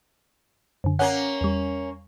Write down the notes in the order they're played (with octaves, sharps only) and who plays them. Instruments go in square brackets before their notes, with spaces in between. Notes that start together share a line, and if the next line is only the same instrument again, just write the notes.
[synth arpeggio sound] F#2 D3
[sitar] A#3 C#4 [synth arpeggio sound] F#5 F#6
[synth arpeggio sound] E2 G3